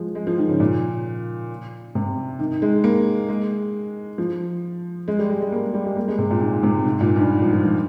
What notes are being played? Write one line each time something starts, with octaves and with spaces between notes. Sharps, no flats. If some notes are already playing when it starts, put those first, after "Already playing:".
Already playing: F3 G#3
G#3
F3
D#3
C#3
A#2
C3
D#3
G#3
A#3
G#3
F3
G#3
G3
G#3
G#3
A#3
G3
G#3
A#3
G#3
C3
A#2
G#2
C3
G#2
A#2
G2
G#2
F3
F3
F3